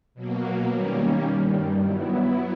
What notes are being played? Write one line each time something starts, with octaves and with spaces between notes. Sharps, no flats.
B2 F#3 A#3
D#3 G3 A#3 C#4
G2 D#3 G3
F#3 B3 E4